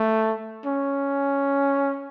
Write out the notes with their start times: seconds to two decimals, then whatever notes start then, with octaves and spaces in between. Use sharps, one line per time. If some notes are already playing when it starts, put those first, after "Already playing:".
Already playing: A3
0.65 C#4